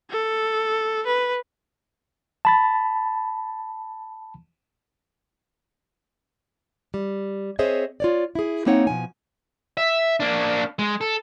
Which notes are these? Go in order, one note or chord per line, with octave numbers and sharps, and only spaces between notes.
A4
B4
A5 B5 A6
G3
C4 G#4 C5 C#5 D#5 E5
F4 C#5 D5
E4 G#4
A#3 C4 D#4 C#5 F#5
B2 F3 G#5
E5
A#3 D4
G#3
A4